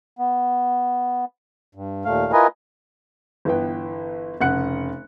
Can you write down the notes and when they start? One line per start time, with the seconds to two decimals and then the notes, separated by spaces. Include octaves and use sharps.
0.19 B3
1.75 G2
2.05 D#2 A#2 A3 F5
2.33 E4 F4 A#4 B4 D#5 G#5
3.45 G1 E3 B3 G5
4.41 F1 C#3 F#5 F#6 C#7